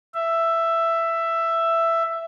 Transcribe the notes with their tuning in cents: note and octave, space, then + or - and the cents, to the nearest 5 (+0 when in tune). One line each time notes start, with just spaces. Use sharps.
E5 +10